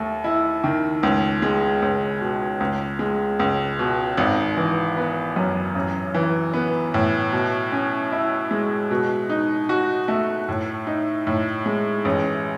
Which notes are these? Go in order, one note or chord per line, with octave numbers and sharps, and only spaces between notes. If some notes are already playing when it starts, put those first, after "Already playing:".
Already playing: D#2 A3
E4
D#3
C#2
G#3
C#2
B2
C#2
G#3
C#2
B2
G#1
E3
B3
F#2
A1
E3
B3
A2
B2
C#4
E4
G#3
B2
D#4
F#4
A3
A2
D#4
A2
G#3
A1